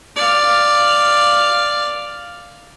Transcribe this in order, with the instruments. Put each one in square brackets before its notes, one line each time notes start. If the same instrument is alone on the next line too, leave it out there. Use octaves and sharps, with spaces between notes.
[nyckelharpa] D5 F5